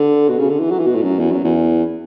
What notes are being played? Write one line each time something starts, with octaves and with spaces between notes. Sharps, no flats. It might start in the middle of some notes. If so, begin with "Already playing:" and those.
Already playing: D3
B2
C#3
D3
E3
F#3
E3
B2
A2
F#2
E2
F#2
E2